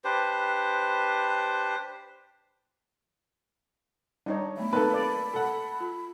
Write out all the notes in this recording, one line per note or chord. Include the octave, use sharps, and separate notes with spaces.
D4 G4 B4 C5
G3 D4 D#4 C#5
F#3 A3 B3 B5
A#3 C4 D#4 A4 B4
D5
A4 F#5
F4